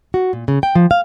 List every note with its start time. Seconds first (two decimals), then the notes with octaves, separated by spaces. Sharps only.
0.14 F#4
0.33 A#2
0.48 C#3
0.63 G5
0.75 F3
0.91 F5